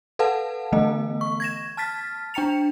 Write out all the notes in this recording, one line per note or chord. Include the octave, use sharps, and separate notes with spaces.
A4 B4 F5 F#5 A5
D3 E3 A3 B3 D#5
C#6
G#6 A#6 E7
A5 F6 A6 B6
D4 G5 A#5 C#7 F7